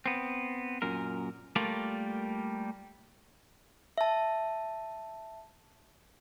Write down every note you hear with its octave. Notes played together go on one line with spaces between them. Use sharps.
B3 C4
F#2 A#2 A#4
G3 A3 A#3 F4 A#4 D5
E5 A5